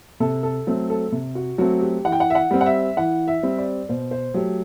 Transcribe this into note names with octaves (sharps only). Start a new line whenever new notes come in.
C3 A4
A4
F#3 A3 C4
A4
C3
F#4
F#3 A3 C4 F#4
G4
E3 F#5
G5
F#5
E5
F#5
G3 C4
F#5
E5
E3 F#5
E5
G3 C4
D5
B2 C5
C5
F#3 A3 G4